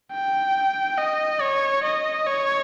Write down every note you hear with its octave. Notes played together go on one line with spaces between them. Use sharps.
G5
D#5
C#5
D#5
C#5